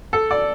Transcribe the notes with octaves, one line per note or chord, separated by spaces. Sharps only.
A4
D5